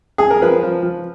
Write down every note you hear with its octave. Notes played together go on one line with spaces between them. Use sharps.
G#4
A#4
F3 B4
F3
F3